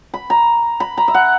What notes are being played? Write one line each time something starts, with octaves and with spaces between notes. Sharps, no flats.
B5
A#5
B5
A#5
E5
F#5